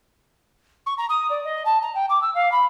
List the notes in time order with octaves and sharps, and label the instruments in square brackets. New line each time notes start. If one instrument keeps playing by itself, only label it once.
[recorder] C#6
A#5
D#6
D5
D#5
A5
A#5
G5
D6
E6
F5
B5